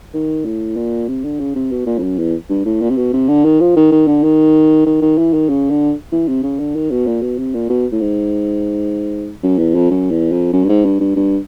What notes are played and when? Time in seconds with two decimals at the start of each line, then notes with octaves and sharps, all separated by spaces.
0.14 D#3
0.45 A2
0.76 A#2
1.08 C3
1.24 D3
1.39 C#3
1.55 C3
1.71 B2
1.86 A#2
1.98 F2
2.02 F#2
2.18 E2
2.49 G2
2.65 A2
2.81 A#2
2.90 C3
2.97 B2
3.13 C3
3.28 D3
3.44 D#3
3.60 F3
3.76 D#3
3.92 D#3
4.07 D3
4.23 D#3
4.86 D#3
5.02 D#3
5.18 E3
5.33 D#3
5.49 C#3
5.70 D3
6.12 E3
6.28 C3
6.43 C#3
6.59 D3
6.75 D#3
6.91 B2
7.07 A#2
7.22 B2
7.38 C3
7.54 A#2
7.70 B2
7.92 A2
8.01 G#2
9.43 F#2
9.58 E2
9.75 F2
9.90 F#2
10.11 E2
10.32 F2
10.53 F#2
10.64 G2
10.69 G#2
10.85 G2
11.00 G2
11.16 G2